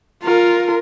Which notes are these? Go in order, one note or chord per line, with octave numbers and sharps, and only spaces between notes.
F4 A#4